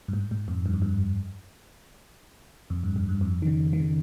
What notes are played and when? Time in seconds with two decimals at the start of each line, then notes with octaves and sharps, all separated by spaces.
0.08 G2
0.13 G#2
0.31 G#2
0.48 F2
0.66 G2
0.74 F2
0.82 G2
2.70 F2
2.83 G2
2.96 G2
3.09 G2
3.21 F2
3.42 D#3
3.47 C#3
3.73 D#3
3.80 C#3